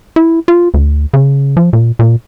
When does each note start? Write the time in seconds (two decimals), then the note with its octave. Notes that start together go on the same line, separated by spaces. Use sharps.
0.16 E4
0.48 F4
0.74 D2
1.14 C#3
1.57 F3
1.73 A#2
1.99 A#2